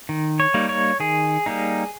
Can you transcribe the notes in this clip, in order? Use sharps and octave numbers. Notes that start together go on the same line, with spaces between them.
D#3
C#5
G3 A#3 D#4
C#5
D#3 G#4
G3 A#3 D#4